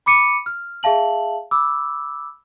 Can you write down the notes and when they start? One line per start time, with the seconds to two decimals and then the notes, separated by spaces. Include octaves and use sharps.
0.06 B5 D6 C#7 D#7
0.46 F6
0.83 G#4 E5 F5 A5 F#7
1.51 B5 D6 E6